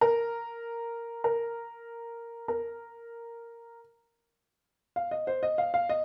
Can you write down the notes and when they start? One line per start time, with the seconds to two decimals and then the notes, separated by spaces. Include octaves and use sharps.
0.01 A#4
1.24 A#4
2.48 A#4
4.96 F5
5.11 D#5
5.27 C5
5.43 D#5
5.58 F5
5.74 F5
5.89 D#5